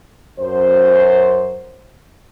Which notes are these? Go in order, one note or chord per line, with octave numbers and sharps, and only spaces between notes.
F#2 C5